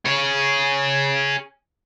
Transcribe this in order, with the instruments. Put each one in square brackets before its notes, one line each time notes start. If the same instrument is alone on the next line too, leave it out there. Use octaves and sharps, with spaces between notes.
[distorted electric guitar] G#4 C#5